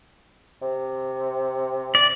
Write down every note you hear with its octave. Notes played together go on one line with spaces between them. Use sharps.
C3
D5